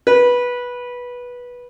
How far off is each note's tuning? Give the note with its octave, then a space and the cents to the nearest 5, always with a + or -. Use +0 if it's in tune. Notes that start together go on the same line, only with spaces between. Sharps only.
B4 -15